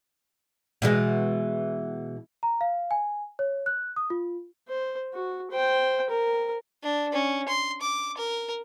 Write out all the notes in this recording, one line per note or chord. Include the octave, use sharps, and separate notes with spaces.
B2 E3 G#3
A#5
F5
G#5
C#5
F#6
D#6
F4
C5
F#4
C5 G5
A#4
D4
C#4
C6
D6
A#4